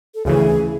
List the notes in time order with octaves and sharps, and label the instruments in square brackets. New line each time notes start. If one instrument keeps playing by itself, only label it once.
[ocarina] A4
[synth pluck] D2 C#3 E3 [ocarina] G#4